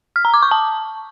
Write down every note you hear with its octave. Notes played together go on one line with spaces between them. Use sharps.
F6
A#5
D6
C#6
A5